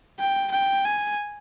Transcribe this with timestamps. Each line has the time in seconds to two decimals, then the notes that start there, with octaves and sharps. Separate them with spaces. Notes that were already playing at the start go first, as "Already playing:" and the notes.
0.19 G5
0.52 G5
0.85 G#5